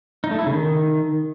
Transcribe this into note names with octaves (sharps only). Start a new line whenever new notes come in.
D#4
A3
E4
C#3
D#3